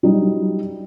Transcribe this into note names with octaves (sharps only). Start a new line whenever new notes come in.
F#3 G3 D#4